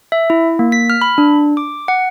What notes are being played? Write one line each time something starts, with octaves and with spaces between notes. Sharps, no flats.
E5
E4
A#3
B6
F6
B5
D4
D6
F#5